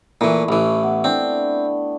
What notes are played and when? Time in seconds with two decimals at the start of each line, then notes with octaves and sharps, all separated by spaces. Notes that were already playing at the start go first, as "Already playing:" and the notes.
0.21 A#2 E3 A3 E4
0.49 A1 E3
0.83 B3
1.04 C4 D4 G5